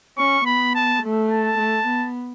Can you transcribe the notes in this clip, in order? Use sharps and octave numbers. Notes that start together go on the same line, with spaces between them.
C#4 C#6
B3 B5
A5
A3
A5
A3
B3